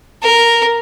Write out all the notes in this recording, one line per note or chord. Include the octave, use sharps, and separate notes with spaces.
A#4